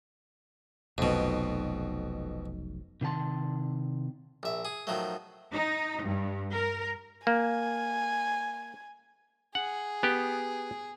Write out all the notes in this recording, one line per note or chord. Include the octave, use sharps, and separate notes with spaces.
F1 B1 F2 B2
C3 D#3 F#4 A5 C6
A#1 E5
G#4
D#3 F3 F#3 A3
D#4
G2
A#4
A#3 G#5
G#4 F#5
B3 G4